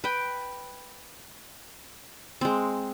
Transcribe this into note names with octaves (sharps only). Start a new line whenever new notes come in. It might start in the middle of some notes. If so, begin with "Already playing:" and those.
B4 G5
G#3 C4